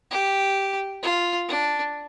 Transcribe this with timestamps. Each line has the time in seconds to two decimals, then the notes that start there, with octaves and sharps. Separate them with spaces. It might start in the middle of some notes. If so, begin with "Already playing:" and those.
0.11 G4
1.03 F4
1.48 D4